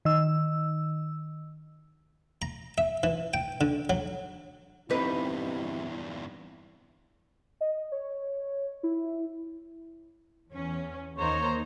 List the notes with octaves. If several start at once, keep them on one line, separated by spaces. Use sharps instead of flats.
D#3 E6
A#5
E5
E3
G5
D3
F#3
E2 G2 C4 D#4 E4 G4 B4
D#5
C#5
E4
E2 C#4
D#2 A#3 D#4 C5 C#5 A#5